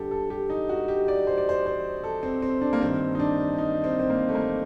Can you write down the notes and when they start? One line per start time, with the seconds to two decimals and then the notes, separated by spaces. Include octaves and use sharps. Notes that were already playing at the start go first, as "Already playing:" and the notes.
Already playing: G2 D3 G4 A4
0.11 A4
0.30 G4
0.50 D#4
0.69 F#4
0.88 G4
1.08 D5
1.27 C5
1.38 D5
1.49 C5
1.66 C5
2.04 A4
2.23 C4
2.42 C4
2.61 D4
2.73 A#3
2.81 G2 D#3 C4
3.15 D#4
3.19 D4
3.58 D#4
3.84 C4
4.00 C4
4.10 A#3
4.29 A3
4.35 A#3